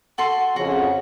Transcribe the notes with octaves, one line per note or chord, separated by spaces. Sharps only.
F#4 A4 C6
F2 C#3 F#4